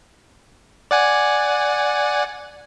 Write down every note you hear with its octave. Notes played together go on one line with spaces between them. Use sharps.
D5 F#5 G#5